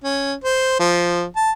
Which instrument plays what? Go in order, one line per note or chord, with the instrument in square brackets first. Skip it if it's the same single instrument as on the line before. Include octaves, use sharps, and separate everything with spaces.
[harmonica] C#4
C5
F3
A5